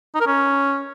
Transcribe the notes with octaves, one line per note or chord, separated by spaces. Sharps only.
D#4
A#4
C#4